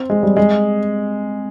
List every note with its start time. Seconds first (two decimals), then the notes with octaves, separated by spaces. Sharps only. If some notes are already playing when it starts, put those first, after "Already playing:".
Already playing: C4
0.10 G#3
0.23 G3
0.37 G#3